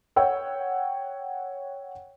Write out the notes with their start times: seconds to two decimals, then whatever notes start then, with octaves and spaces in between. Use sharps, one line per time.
0.16 C#5 F#5 G5 E6